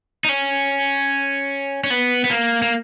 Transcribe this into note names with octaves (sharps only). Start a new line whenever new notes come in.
D#4
C#4
C#4
B3
B3
A#3
A#3